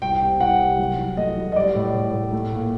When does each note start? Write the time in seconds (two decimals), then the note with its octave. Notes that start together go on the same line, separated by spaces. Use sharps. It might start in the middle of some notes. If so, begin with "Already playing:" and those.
0.02 C2 G5
0.22 C3
0.40 C2 F#5
0.59 G3
0.79 F#3
0.98 F#3
1.17 A3 D#5
1.37 F#3
1.52 D#5
1.56 G3 D5
1.75 A2
1.94 A2
2.13 A2
2.32 A3
2.52 A#2